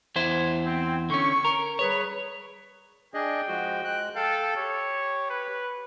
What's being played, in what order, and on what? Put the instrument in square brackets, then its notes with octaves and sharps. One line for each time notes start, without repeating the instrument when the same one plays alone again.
[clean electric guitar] E2 E4 C5
[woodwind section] C4
[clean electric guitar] D3 C#4 [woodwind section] C#6
[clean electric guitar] A#4
[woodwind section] G3 G#4 B4 [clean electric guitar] C#5
[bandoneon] D4 G#4 D#5 [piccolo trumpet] G5
[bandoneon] F3 G#3 F#4
G#3 F#6
[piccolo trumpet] A4 [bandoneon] F5 G5
[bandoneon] G4 [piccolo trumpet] C#5
[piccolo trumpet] B4